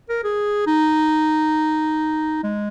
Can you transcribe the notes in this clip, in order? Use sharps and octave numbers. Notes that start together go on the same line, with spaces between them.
A#4
G#4
D#4
G#3